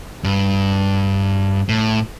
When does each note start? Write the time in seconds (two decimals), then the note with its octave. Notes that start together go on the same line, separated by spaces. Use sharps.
0.24 G2
1.69 A2